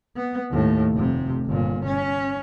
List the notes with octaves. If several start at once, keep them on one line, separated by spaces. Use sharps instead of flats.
B3
D#2 A2
F1 C3
G1 A#2
C#4